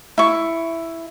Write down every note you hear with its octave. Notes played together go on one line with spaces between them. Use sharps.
E4 C#6